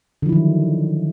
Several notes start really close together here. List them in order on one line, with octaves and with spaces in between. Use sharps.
D3 F3 E4 D#3 F#3